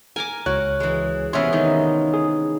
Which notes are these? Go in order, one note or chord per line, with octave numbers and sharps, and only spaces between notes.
A#4 G#5 A#5 D6
C#2 F#4 A#4 C#5 F#6
E3 G#3
C3 E3 B3 C#4 G#4 E5 C6
D#3 D#4
G#4